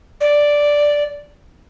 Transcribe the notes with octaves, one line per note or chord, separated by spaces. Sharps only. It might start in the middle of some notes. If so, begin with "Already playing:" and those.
D5